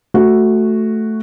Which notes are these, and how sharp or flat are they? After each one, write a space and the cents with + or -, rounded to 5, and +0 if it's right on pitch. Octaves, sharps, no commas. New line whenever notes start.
A3 +0 F#4 +0